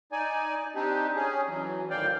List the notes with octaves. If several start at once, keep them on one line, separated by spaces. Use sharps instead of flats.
D#4 D5 G#5
C4 D4 D#4 G4
C#4 G#4
E3 F#3
D2 A2 D#3 D5 F5 G5